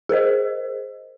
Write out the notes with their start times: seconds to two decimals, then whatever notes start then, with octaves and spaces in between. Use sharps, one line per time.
0.09 G#4 A#4 C5 D#5